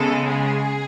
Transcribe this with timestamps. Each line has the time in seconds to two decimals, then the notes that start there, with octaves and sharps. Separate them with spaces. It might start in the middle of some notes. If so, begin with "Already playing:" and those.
Already playing: C#3 G#3 B3 A4
0.27 G#4